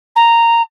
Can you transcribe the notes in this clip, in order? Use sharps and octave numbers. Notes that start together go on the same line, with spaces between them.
A#5